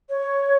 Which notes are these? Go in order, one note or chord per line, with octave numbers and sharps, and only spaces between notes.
C#5